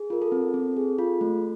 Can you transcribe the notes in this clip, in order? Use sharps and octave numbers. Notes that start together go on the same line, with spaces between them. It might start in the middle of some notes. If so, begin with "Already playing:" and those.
Already playing: G#4
F4 A#4
A4
C4
C4
G#4
F4
A3